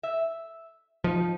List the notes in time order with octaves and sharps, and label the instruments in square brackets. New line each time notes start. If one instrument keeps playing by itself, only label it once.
[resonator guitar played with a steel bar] E5
[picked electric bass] F3 [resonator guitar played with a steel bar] D#4